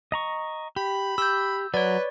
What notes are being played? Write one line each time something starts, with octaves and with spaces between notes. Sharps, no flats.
D#5 A#5 C#6
G4 B5
G4 E6 G6
F#3 B4 C#5 D5